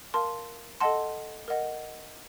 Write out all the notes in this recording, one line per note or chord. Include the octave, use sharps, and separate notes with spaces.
A#4 F5 A5 C6
A4 D#5 F#5 A5 C6
A#4 D#5 F#5